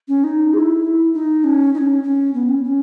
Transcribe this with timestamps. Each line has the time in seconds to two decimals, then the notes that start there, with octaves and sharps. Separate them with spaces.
0.08 C#4
0.24 D#4
0.53 G#4
0.58 E4
1.14 D#4
1.44 C#4
1.74 D#4
1.78 C#4
2.03 C#4
2.34 B3
2.48 C#4
2.64 C#4